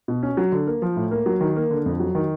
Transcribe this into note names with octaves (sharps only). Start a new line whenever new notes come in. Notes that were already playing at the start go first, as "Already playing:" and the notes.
B2
C#4
F#3
D3
A#3
F3
A2
A#3
F#3
D#3
A#3
D3
F2
F#3
D#3